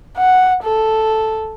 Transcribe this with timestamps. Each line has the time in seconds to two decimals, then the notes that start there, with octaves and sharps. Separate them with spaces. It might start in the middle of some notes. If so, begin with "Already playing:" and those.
0.18 F#5
0.64 A4